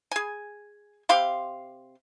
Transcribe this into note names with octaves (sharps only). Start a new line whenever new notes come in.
G#4 G#5
C3 G4 F5 C6